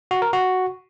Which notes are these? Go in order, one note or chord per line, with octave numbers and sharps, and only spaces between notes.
F#4
A#4
F#4